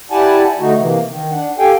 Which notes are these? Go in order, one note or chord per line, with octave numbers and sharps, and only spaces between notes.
E4 G4 D5 F#5 G#5 A5
D3 A3 D#4 F#4
C3 E3 A#3
D#3
D4 F#5
G4 A4 F5 G5 G#5